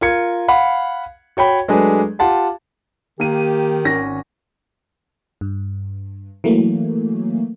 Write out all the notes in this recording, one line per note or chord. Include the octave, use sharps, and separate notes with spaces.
F4 A#4 G#6 C#7
F5 F#5 B5
F#4 C#5 G5 B5
F#3 G#3 A3 D4 G#4 B4
F4 G4 F#5 A5 C6
D#3 A#3 G4 D#7
G#1 C#4 A#6
G2
E3 F#3 A3 A#3